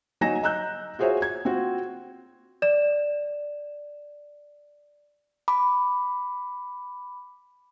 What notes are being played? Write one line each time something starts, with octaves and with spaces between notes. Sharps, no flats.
F#3 D#4 G#5 A#6 E7
D#5 A#5 E6 F#6 G6
F4 F#4 G#4 C5 C#5 E5
G#6
C4 F4 F#4
D5 E7
B5 D6